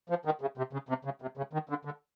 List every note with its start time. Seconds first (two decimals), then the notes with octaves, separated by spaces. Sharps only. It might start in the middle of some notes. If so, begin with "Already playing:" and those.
0.09 F3
0.25 D#3
0.41 C#3
0.58 C3
0.73 C#3
0.89 C3
1.05 C#3
1.22 C3
1.37 C#3
1.53 D#3
1.69 D3
1.85 D3